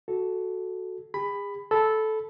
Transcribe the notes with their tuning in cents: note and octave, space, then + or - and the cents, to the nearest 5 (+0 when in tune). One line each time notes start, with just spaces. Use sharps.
F#4 +0 A4 -5
G#4 -40 B5 +10
A4 -10 B5 +0